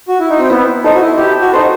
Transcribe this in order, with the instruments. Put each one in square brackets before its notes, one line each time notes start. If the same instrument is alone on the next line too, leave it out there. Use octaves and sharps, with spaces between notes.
[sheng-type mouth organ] F#4
E4
D#4
C4
[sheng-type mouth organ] B3 [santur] E4
[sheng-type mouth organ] D#4 [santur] A4 C5 D#5
[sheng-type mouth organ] F#4
E4
[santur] E4 [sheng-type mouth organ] G4
[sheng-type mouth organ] F#4
[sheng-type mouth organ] D#4 [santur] A4 C5 D#5